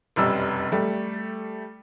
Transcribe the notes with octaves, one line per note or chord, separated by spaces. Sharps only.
F1 B1 F#2 G3 E6
G3 A3